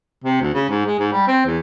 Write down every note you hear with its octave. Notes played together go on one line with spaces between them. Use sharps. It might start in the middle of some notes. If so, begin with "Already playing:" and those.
C3
D2
C#3
G#2
G#3
G#2
G3
C4
E2